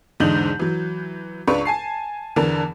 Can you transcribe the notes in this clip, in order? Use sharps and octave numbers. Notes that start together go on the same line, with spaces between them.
E2 G#2 D3 D#4 G6 F#7
E3 F#3
C#2 D4 B4 C#6
G#5 A5 C7
E2 D3 E3 D4 A#4 A5